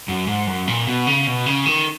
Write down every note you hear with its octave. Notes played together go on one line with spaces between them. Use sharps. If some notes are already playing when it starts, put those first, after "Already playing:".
F#2
G#2
F#2
A#2
B2
C#3
B2
C#3
D#3